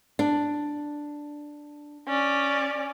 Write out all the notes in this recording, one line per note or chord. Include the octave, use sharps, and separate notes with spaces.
D4
C#4 D5